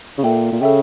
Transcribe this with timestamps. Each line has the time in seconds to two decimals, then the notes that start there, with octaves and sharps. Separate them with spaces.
0.18 C#3
0.24 A#2 A4 E5 G5
0.52 A#2
0.61 C#3 A4 E5 G5